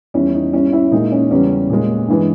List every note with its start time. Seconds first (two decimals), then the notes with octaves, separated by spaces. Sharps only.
0.14 E2 D#3 G3 C#4 E4
0.34 D#4
0.53 G#2 G3 C#4 E4
0.73 C#4 E4
0.92 A#2 G#3 D#4
1.12 C#4
1.31 E2 C#3 E3 G3 C#4
1.70 A#2 G#3
2.08 G2 E3 G#3